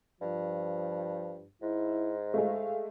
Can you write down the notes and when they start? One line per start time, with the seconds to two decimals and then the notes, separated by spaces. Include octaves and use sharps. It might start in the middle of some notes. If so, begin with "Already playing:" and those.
0.21 G2 F3
1.62 G#2 E4
2.34 G#3 A3 F5